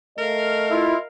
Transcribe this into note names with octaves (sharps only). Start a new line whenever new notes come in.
A3 A#4 D#5 F5
E4 F4